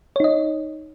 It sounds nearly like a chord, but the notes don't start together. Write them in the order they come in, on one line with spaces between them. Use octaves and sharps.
C#5 D#4 D#5